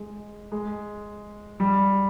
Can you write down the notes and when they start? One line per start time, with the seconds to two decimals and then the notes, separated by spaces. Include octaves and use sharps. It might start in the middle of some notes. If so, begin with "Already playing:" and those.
Already playing: G#3
0.52 G#3
1.60 G3